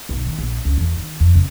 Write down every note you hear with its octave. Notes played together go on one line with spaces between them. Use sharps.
B1
D#3
A#1
C#2
E2
D#3
F2
C#3